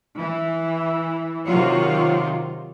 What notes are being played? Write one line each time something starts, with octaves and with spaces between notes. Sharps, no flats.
E3
C3 D#3 F#3 F4